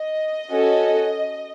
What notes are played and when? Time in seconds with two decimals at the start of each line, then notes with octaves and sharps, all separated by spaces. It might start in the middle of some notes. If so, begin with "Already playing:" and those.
Already playing: D#5
0.50 C#4 F#4 A4